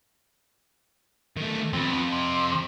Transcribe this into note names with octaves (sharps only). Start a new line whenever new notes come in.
D#3 A3
F2 B3 C4
C3